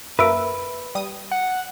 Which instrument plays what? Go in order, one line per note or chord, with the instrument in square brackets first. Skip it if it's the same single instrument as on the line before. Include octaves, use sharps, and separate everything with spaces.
[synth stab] F#2 A#3 A#4 [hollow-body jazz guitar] B4 [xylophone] E5 E6 D7
[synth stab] G3 D#6
[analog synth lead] F#5